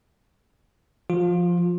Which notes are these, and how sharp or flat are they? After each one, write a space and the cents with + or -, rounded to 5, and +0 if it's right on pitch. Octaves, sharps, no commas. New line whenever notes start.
F3 +0 F4 +20